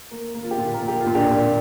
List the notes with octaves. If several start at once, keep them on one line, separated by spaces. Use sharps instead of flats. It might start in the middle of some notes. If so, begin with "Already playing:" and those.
A#3
A#3
F4
G4
A#2 F4
A#4
A#3
G4
F4
A#2
D4 G4
A#2